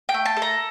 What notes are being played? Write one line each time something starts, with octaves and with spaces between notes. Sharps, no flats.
G5
A3
A5
A4
A#5